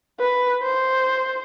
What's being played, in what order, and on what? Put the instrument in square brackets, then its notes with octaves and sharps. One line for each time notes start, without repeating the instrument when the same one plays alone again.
[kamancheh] B4
C5